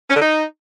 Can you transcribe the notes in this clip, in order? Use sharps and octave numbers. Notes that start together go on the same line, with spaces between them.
C#4
D3
D#4